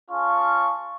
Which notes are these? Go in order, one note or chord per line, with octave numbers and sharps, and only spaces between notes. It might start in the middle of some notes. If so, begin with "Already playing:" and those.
C#4 F4 G#4 F5 A5 C#6